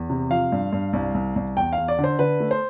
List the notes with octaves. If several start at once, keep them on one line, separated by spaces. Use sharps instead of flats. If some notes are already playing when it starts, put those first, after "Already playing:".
Already playing: E2
C3
F3 F5
G2
G2
C2
C2
C2
E2 G5
E2 F5
D5
D3
C5
D3 B4
A3
C5